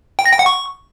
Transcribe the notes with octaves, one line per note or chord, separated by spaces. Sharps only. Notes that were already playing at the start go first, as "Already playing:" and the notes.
G5
A#6
G5
F#5
C#6